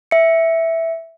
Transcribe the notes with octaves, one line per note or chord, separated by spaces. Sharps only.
E5 C#7